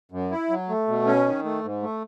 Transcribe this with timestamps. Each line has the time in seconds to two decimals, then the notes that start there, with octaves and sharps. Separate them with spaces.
0.12 F#2
0.31 E4
0.50 F#3
0.69 A3
0.87 B2
1.06 C#4
1.26 D#3
1.44 A3
1.63 G#2
1.82 A3